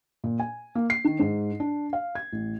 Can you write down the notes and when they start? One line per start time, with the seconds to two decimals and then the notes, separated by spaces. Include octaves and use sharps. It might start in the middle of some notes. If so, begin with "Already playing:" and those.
0.24 A#2
0.40 G#5
0.75 A#3
0.90 C7
1.05 D#3
1.19 G#2
1.60 D4
1.93 F5
2.15 G#6
2.32 A1